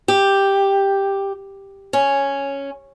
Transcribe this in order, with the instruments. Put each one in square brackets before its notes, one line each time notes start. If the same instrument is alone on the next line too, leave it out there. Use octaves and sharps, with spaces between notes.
[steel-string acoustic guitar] G4
C#4